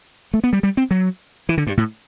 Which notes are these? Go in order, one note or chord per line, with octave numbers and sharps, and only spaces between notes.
A3
B3
G3
G3
C4
F#3
E3
D3
G2
A2